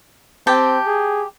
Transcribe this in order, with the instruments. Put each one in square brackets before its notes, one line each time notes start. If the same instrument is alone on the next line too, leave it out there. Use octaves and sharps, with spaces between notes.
[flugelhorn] C4 [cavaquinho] G4 G5 A5
[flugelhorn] G#4